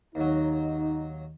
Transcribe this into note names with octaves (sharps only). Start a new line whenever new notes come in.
D#2 F#3 D#4